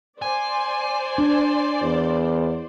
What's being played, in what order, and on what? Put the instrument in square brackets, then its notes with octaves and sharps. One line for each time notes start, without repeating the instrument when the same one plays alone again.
[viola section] C5 D5 [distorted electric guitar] G#5
[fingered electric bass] D4
[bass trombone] E2